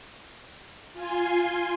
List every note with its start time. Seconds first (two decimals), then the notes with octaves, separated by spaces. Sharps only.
0.93 F4 G#5 C6